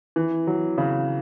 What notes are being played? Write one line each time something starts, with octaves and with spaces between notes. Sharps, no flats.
E3
F#3
C#3